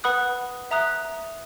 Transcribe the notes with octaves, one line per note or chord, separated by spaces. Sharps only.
B4 F#5 B5 D#6 F#6
E5 A#5 D#6 F#6